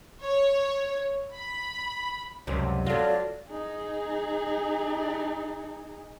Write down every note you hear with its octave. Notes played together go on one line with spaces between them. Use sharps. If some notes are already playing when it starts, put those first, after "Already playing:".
C#5
B5
C#2 F#2 C3 G3
F#3 A3 F4 D5 F5
D#4 G#4